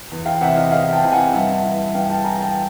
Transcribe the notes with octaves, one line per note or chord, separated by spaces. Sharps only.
E2
F5 G5
C3 E3 E5 F#5
D#5 F5
E2 D#5 F5
G5 A5
C3 E3
F#5 G#5
G2 E5 F#5
E3
G2 F5 G5
G5 A5
E3 G#5 A#5
G5 A5